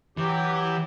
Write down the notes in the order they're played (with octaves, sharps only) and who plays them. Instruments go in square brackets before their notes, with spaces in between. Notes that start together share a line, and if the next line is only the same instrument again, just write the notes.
[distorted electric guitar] E3 [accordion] F#3 G4